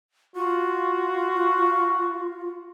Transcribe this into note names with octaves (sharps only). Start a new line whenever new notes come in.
F4 F#4